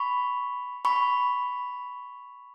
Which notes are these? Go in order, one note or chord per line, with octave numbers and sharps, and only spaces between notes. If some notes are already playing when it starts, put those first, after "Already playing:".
Already playing: B5 C#6
B5 C#6